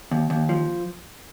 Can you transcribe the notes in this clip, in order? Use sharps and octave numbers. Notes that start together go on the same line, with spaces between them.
D#2
D#2
F3